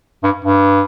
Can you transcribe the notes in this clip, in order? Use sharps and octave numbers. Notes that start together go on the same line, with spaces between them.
G2
G2